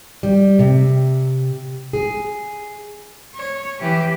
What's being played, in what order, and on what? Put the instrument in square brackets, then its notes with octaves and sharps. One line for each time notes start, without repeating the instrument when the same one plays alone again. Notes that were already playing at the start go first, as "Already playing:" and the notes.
[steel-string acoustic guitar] G3
C3
G#4
[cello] C#5
E3 G4